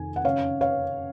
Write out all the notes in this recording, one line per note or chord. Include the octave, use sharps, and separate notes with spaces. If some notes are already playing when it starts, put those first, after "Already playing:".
Already playing: F2 C3 D#3 G#5
F#5
F#2 C#3 C#5 F5
C#5 F5